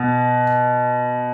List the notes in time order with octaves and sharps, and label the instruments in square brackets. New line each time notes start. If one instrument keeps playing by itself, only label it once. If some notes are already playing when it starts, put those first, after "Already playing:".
Already playing: [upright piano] B2